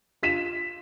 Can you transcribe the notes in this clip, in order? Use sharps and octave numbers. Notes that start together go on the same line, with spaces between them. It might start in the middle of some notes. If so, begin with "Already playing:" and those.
F4 B6 E7